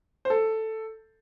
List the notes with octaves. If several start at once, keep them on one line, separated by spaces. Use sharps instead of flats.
C5
A4